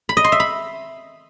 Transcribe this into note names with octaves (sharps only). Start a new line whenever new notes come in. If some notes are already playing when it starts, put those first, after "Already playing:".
B5
D#5
C6
E5
B5